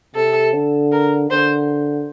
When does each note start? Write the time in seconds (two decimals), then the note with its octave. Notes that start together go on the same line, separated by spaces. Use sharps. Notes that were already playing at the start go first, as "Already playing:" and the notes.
0.15 C3 A4
0.53 D3
0.92 A#4
1.30 D3 C5